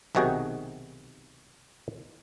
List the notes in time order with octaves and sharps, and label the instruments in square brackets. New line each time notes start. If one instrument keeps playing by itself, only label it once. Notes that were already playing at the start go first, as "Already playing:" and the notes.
[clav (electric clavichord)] B1 C3 D#3 F#4 G#4 G5